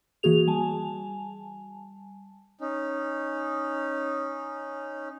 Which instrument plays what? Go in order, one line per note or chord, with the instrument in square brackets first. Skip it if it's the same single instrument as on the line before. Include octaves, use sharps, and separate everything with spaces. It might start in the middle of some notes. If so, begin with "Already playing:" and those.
[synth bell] E3 A#3 F#4 G#4 F7
G3 G#5 A5
[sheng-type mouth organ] C#4 D#4